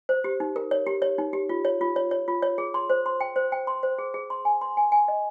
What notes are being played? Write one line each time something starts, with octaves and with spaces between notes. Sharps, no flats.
C5
G4
D#4
A#4
C#5
G4
C#5
D#4
G4
F4
C#5
F4
C#5
C#5
F4
C#5
G#4
C6
C5
C6
G5
C5
G5
C6
C5
G#4
G#4
C6
G#5
C6
G#5
G#5
D#5